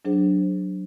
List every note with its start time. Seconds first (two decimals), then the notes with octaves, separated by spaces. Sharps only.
0.05 F#3 D4 G#4 C5